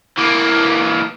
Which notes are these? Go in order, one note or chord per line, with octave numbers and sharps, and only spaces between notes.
E3 A#3